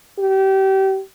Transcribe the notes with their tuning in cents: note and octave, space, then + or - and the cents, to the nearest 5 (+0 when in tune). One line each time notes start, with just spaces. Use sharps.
G4 -30